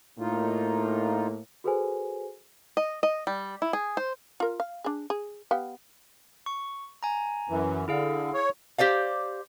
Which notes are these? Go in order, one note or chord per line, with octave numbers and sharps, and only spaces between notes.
A2 A#3 D#4 F4
F#4 G#4 A4 B4 C5 G#5
D#5
D#5
G3
E4
G#4
C5
F4 A#4
F5
D4 G#4
G#4
B3 G4 F5
C#6
G#5 A#5
F#2 E3
D3 E4 G#4 F5
C#5
G4 C5 D5 F5